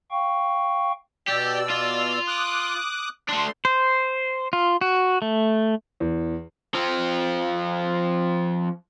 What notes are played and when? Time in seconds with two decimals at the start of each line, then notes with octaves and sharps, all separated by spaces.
0.11 F5 G5 C#6
1.28 B2 G4 D5 E6
1.70 F4
2.28 D6 D#6 F#6
3.29 A3 D4 C6
3.65 C5
4.53 F4
4.81 F#4
5.22 A3
6.00 E2
6.74 F3 C4